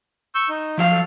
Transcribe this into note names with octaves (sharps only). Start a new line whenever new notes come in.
C#6 E6 G6
D#4
F3 F#3 F5
A4